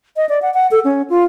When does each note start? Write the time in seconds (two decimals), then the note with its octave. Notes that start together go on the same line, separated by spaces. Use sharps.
0.16 D#5
0.29 D5
0.42 F#5
0.54 F#5
0.71 A4
0.85 C#4
1.10 F4